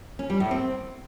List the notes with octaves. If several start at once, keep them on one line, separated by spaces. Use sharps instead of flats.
C#4
G3
A2
C4